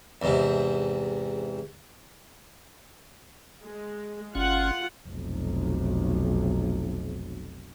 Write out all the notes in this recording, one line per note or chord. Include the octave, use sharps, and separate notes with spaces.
E2 G#2 C3
G#3
G1 C#4 F4 F#5
F1 B1